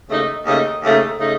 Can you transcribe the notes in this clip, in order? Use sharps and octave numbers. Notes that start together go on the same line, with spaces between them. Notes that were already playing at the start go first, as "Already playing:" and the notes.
D#2 C#3 A3 D#4
D#2 C#3 A3 D#4
D#2 C#3 A3 D#4
C#3 A3 D#4